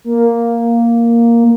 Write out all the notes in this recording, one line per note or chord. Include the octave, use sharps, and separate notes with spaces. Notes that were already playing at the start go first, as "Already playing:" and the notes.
A#3